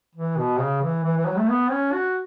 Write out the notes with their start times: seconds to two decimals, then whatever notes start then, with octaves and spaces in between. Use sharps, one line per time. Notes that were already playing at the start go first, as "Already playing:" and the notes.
0.15 E3
0.37 B2
0.59 C#3
0.82 E3
1.04 E3
1.17 E3
1.26 F#3
1.38 A3
1.48 B3
1.71 C#4
1.93 F#4